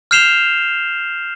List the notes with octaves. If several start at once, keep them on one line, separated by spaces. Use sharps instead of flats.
F6 G6 C7 E7 F7 G7